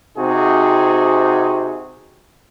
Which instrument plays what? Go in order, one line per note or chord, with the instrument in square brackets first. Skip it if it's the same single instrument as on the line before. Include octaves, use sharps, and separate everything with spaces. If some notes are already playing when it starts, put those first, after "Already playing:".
[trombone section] C3 C4 D#4 F#4 G#4